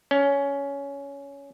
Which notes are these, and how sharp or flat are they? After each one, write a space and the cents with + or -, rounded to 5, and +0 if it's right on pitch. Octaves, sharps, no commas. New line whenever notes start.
C#4 +15